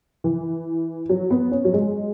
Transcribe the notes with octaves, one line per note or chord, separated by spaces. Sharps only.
E3
F#3
B3
C#4
F#3
G#3